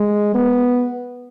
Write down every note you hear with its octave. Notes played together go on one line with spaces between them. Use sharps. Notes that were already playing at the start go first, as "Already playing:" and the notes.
Already playing: G#3
B3